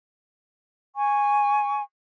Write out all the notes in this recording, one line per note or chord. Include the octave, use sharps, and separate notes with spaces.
G#5 C#6